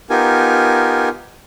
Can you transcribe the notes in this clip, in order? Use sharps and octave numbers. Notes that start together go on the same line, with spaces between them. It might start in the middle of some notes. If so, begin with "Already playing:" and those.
B3 D#4 F4 G4 A#4 G#5